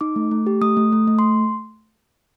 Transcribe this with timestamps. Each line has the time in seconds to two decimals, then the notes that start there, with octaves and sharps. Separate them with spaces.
0.01 D#4 D6
0.16 A3
0.31 A3
0.47 G4
0.62 A3 D#6
0.77 A3
0.92 A3
1.07 A3
1.19 C6